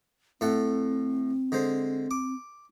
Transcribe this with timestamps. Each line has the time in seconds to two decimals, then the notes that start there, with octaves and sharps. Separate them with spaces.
0.41 A2 C4 A4 F#5
1.52 D3 G#3 C5
2.11 D6